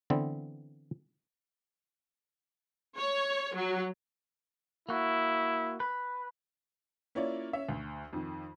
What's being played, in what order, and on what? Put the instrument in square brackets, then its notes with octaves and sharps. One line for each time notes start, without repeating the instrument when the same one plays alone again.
[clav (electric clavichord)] D3 E3 B3 C4
[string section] C#5
F#3
[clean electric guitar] A#3 F#4 [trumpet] E4
[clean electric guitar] B4
[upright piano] A#3 C#4 E4 F4 C#5 D5
C#4 E5
D2
F2 D#3